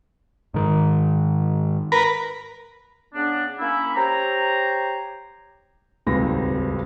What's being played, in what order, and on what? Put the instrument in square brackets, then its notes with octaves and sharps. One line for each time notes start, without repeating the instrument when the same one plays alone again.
[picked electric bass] G#2 D#3
[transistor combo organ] A#4 B4
[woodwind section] C#3 B3 C#4 D4
A#3 C#4 E4
G4 C5 C#5 A#5
[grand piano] D#1 G#1 C#2 C4 B4 A#6